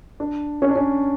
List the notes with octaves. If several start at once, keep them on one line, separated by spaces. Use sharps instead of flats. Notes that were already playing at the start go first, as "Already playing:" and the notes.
D4
C#4
D4
C#4